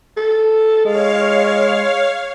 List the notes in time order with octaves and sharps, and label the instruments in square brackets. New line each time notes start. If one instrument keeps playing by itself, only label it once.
[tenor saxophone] A4
[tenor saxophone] G#3 [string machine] C#5 F5